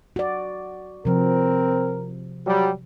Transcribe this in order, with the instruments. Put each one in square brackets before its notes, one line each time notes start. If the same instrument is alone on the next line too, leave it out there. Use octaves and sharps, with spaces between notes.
[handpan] F#4 D5
[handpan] C3 F3 [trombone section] C4 A#4
[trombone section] F#3 G3